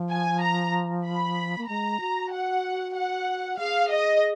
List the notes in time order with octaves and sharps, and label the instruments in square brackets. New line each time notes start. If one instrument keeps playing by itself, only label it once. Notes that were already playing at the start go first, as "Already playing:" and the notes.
Already playing: [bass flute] F3
[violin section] G#5
A#5
B5
[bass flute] A#3
[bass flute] G#3 [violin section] A#5
[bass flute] F#4
[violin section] F#5
F#5
[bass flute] G#4 [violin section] F5
[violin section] D#5